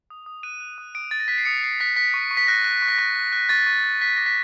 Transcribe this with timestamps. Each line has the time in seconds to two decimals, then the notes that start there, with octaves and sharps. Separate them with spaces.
0.10 D#6
0.26 D#6
0.43 F#6 D#7
0.60 F#6
0.78 D#6
0.95 D#6 D7
1.11 F#6 A6
1.20 A#6
1.28 F#6 B6
1.38 C7
1.45 D#6 C#7
1.62 D#6 C7
1.80 F#6 B6
1.97 F#6 B6
2.14 C#6
2.31 C#6
2.37 B6
2.48 F#6 A#6
2.64 F#6
2.82 C#6
2.88 B6
2.98 C#6 A#6
3.16 F#6
3.32 F#6
3.49 C#6 A6
3.66 C#6
3.84 F#6
4.01 F#6 B6
4.16 D6 A#6
4.26 B6